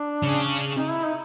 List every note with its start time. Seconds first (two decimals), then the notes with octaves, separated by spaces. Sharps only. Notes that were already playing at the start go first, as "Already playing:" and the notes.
Already playing: D4
0.23 C#3
0.77 D#4
0.91 E4
1.04 D#4